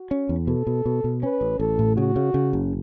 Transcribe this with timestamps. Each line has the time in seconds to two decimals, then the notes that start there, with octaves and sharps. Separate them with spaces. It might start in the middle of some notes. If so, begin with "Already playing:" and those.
Already playing: F#4
0.11 C#4
0.29 E2
0.47 B2 A4
0.67 B2
0.86 B2
1.04 B2
1.23 C#4 B4
1.41 A1
1.60 A1 A4
1.79 A2
1.97 C#3 F#4
2.16 C#3
2.34 C#3
2.53 F#1